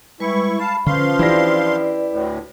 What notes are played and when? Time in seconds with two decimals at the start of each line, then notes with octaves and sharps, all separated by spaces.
0.20 G3 G#3 E4 B4 C#6
0.59 F5 A5 B5
0.86 D3 F3 C#4 B4 F5 C6
1.19 E3 C#4 D4 E4 G4 B4 D5 A#6
2.11 D2 A2